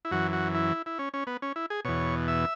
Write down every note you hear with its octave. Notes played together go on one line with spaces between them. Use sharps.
E4
F#2 E3 F#4
F#4
E4
E4
C#4
C#4
B3
C#4
E4
G#4
E2 B2 C#5
E5